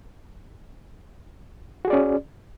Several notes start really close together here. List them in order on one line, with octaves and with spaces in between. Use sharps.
F#4 G#4 D5 C#4